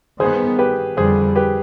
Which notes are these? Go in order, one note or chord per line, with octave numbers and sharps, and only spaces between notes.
G2 D#3 B3 G#4 C5
G4 B4
F2 D3 G3 G#4 C5
G4 B4